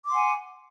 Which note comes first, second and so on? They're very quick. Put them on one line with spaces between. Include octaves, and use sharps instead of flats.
D6 C6 F#5 G#5